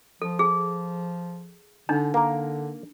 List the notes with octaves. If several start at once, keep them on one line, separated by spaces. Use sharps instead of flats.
F3 A4
G#4
D3 D4 D#4
D3 A#3 A#4